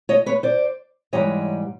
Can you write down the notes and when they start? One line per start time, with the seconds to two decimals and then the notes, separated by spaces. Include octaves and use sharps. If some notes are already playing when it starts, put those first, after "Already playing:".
0.09 C#5 D#5
0.26 B4 C#5
0.43 C5 D5
1.13 G#2 E3 G3 C#5 D#5